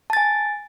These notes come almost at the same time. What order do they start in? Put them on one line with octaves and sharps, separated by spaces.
A5 A6 G#5